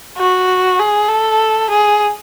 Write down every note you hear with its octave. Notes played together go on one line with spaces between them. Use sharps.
F#4
G#4
A4
G#4